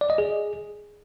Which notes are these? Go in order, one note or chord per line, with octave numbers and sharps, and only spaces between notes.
D5
D#5
G#4